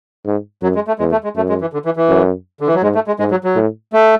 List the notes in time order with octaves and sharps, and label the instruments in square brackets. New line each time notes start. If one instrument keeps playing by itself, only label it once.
[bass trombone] G#2
[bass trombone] F#2 [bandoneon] F#3
[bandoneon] G#3
A3
[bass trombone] E2 [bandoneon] G#3
[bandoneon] A3
G#3
[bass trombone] F#2 [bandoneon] A3
[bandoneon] G#3
E3
D3
E3
E3
[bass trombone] F#2
[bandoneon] D3
E3
F#3
[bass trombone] G#2 [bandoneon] G#3
[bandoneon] A3
G#3
[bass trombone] G#2 [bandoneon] G#3
[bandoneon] F#3
F#3
[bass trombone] A2
[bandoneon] A3